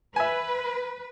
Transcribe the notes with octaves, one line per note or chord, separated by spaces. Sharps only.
B4 E5 G#5